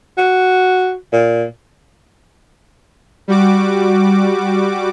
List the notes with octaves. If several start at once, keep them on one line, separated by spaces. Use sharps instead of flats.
F#4
A#2
G3 F#4 D6